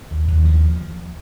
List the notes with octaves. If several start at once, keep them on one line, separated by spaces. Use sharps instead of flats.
D#2
D#2
F3